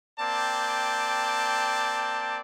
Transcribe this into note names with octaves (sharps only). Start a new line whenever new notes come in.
A#3 C4 D5 G5 A5